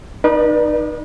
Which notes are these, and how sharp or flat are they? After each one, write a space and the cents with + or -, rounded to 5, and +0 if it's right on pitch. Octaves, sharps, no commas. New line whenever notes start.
D#4 -15 B4 -35 D5 +25